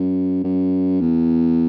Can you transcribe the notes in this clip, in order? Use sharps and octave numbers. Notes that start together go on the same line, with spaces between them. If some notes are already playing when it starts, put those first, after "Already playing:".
Already playing: F#2
F#2
E2